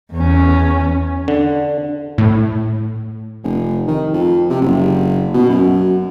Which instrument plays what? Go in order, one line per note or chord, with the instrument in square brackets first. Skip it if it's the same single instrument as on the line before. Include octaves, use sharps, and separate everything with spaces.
[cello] E2 C#4
[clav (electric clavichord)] D3
[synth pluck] A2
[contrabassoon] F1
D#3
F2
C3
F#1
B2
F#2